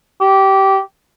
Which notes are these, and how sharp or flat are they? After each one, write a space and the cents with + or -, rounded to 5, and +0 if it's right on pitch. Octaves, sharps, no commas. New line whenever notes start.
G4 -20